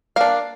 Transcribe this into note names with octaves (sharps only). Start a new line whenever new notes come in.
A#3 D4 F5